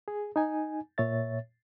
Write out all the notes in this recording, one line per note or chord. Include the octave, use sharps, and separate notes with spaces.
G#4
D#4 G#5
A#2 C#5 E5 A6